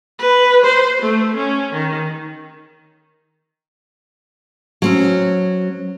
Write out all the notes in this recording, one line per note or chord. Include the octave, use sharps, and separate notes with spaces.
B4
C5
A3
C#4
D#3
F#3 C4 C#4